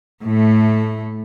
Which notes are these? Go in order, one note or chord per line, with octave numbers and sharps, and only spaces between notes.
A2 A3